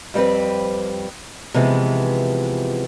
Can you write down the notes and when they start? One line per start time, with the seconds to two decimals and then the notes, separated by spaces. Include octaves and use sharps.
0.14 F2 G3 A3 C4 B4
1.54 C3 E3 F3 G#3 B3